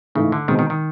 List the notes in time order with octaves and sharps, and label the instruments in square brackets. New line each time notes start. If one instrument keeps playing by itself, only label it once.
[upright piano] G#2 E3 A3 [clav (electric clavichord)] C#3
[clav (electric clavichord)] D3
[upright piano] B2 G#3 C4 [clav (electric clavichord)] D#3
[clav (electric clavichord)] D#3
D#3